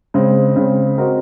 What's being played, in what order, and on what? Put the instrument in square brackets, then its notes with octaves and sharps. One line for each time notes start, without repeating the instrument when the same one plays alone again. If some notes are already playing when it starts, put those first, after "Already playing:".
[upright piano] C#3 G#3 C4
C#3 G#3 C4
C4 F#4 A#4 D#5